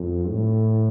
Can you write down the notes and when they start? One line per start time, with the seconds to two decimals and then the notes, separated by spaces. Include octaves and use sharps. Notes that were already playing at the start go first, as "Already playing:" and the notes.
Already playing: F2
0.29 A2